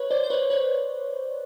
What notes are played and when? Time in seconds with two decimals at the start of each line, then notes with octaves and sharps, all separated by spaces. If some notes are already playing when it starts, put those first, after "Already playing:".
Already playing: B4 C#5
0.11 C5 D5
0.24 C5
0.30 B4 C#5
0.50 B4 C#5